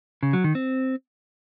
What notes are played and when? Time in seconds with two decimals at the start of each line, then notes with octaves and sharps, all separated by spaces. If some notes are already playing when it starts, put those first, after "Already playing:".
0.23 C#3
0.33 F#3
0.44 D#3
0.55 C4